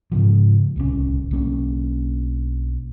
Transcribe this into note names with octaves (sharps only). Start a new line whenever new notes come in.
G#2 C#3 F3
D1 C2 C3 C#4
B1 A#3 C#4